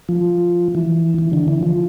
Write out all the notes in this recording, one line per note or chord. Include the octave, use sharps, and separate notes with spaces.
F3
E3
E3
D3
E3
F3